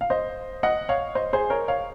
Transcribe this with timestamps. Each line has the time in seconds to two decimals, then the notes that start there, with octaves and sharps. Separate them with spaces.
0.01 F5
0.10 C5 D#5
0.63 D#5 F#5
0.89 C#5 F5
1.15 C5 D#5
1.33 G#4 C5
1.50 A#4 C#5
1.68 C#5 F5